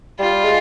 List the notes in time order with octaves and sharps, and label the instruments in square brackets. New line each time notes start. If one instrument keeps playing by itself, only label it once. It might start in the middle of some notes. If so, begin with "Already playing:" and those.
[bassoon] G3 [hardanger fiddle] F4
[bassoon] G#3